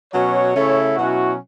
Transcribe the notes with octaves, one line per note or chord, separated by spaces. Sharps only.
B2 F#3 C#4 C#5
C#3 A3 C#4 E4
B2 F#3 C#4 E4 F#4